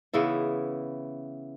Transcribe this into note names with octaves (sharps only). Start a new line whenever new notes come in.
C#3 E3 B3 E4